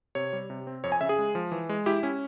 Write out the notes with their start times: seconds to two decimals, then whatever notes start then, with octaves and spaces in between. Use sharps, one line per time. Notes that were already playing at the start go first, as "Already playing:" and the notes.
0.15 C3 C#5
0.33 G3
0.50 C3
0.67 C4
0.84 F2 C#5
0.92 G#5
1.01 C#3 E5
1.09 G#4
1.18 G#3
1.35 F3
1.52 E3
1.69 G#3
1.86 E4 G4
2.03 C#4